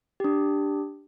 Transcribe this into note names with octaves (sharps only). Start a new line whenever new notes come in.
D4 G4